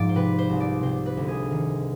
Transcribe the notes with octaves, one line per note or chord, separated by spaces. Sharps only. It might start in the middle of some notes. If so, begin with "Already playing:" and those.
Already playing: G#2 F3 D5
C5
C3 B4
C5
C2
D5
C3 C5
B4
D2
G#4
D#3